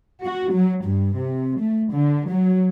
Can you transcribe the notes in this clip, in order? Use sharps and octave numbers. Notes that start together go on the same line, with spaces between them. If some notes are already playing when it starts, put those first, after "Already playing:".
F#4
F#3
G2
C3
A3
D3
F#3